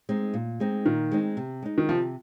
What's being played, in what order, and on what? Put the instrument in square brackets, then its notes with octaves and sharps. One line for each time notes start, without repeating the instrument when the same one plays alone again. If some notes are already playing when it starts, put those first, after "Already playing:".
[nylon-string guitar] G#3 C4 D#4
A#2
G#3 C4 D#4
[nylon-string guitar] A#2 [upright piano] D#3
[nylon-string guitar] G#3 C4 D#4
C3
G#3 D#4
[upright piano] D#3
[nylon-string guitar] C3 [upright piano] F3